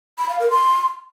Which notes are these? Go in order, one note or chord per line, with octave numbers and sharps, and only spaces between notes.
B5
F5
A#4
C6